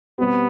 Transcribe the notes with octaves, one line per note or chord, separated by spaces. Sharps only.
B2 G3 B3 C4 G4